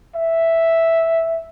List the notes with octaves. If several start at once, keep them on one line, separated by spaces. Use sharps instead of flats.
E5